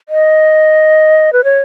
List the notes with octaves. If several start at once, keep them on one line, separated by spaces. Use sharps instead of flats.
D#5
B4
C#5